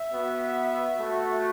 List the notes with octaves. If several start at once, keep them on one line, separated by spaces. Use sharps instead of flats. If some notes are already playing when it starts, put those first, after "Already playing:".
Already playing: E5
B3 F#4
A3 F#4